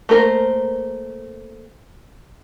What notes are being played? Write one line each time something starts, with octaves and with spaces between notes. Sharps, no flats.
A3 A#3 A#4 C5